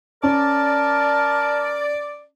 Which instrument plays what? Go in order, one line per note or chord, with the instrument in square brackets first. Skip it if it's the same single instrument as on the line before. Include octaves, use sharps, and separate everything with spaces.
[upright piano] C#4 [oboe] A#4 [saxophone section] D5 [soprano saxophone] A5